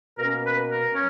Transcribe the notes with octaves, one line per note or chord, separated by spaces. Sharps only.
B2 A#3 C#4 A#4
B4
A#4
F#3 C#4